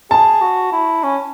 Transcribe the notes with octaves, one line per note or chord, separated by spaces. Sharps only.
G#4 A5
F#4
E4
C#4